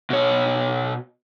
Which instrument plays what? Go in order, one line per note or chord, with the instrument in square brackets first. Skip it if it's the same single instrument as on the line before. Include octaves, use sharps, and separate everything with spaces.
[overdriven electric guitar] B2 C#5